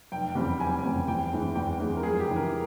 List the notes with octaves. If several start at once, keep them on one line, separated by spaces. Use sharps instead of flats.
F1 G5
E2 C#3 G3 C4
F1 G#5
E2 C#3 G3 C4
E2 G5
E3 G#3 C4
E2 G5
E3 G#3 C4
A#4
F2 G#4
G4
C#3 E3
A#4